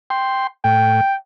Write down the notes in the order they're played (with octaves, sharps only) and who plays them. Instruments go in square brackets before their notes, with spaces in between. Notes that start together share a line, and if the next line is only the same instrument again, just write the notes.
[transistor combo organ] G5 C6
[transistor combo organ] A2 [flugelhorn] G5